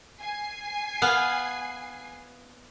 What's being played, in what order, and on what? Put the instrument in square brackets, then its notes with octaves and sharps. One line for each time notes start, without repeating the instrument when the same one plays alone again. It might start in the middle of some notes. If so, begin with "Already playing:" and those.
[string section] G#5 C7
[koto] B3 F5